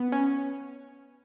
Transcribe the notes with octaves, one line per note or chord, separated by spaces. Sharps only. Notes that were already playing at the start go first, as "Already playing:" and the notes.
Already playing: B3
C#4